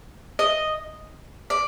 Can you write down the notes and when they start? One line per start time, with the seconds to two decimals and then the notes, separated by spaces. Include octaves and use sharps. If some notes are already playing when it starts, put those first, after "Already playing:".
0.39 D#5
1.50 D5